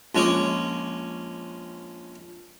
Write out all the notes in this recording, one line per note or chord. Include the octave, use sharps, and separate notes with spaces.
A#1 G#3 C#4 G#4 D6